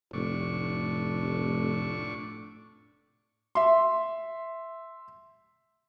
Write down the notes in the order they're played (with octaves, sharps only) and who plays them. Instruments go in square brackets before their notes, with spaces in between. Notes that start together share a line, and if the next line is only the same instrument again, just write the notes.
[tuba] F1 [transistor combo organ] A2 D4 C#6
[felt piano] E5 C6